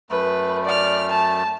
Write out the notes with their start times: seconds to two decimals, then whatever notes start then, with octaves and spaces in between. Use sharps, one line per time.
0.10 F#2 A3 B4
0.65 D5 F6
1.09 A5